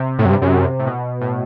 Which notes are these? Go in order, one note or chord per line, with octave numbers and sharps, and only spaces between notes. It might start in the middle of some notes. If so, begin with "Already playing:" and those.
Already playing: C3
A2
F#2
G2
F#2
A2
B2
A2